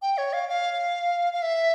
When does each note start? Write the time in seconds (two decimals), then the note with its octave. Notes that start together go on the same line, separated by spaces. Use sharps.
0.02 G5
0.18 C#5
0.33 F5
0.49 F5
1.33 F5
1.42 E5